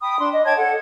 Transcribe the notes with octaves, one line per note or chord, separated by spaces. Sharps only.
G5 B5 D#6
D4 C6
D#5
C#5 G5 A5 G#6
A4 F#5